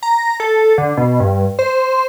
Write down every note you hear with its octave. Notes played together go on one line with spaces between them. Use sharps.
A#5
A4
D3
B2
G2
C5